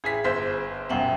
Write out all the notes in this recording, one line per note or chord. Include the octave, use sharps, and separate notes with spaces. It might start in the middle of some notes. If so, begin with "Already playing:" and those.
A1 G#4 G#5 B6
G1 C5 B6
D#1 F#2 B2 E5 F#5 G5